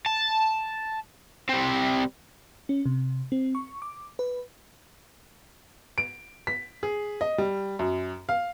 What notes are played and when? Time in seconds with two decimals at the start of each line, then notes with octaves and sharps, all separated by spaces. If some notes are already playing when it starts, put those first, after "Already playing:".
0.06 A5
1.49 G3 C4
2.69 C#4
2.86 C3
3.32 C4
3.55 C#6
3.82 D6
4.19 B4
5.98 D7
6.47 B6
6.83 G#4
7.21 D#5
7.38 G3
7.79 F#2
8.29 F5